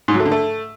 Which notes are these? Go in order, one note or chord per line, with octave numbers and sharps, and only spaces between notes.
G#2
F#3
A3
D3
A3